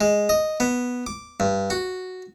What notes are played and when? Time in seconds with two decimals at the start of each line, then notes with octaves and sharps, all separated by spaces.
0.01 G#3
0.29 D#5
0.60 B3
1.07 D6
1.40 G2
1.70 F#4